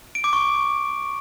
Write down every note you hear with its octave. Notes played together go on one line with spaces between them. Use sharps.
D7
D6
C#6